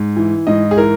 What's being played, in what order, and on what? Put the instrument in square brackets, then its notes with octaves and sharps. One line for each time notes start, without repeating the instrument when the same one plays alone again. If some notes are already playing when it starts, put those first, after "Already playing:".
Already playing: [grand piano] G#2
E3
G#2 D#5
G#4
E3 A#4